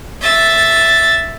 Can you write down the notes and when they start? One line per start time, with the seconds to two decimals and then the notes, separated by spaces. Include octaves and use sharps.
0.22 E5 A6